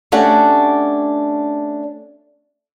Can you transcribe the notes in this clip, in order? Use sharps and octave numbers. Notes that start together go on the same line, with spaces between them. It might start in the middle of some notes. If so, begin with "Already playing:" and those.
A3 C#4 D4 F#4 G4 F#5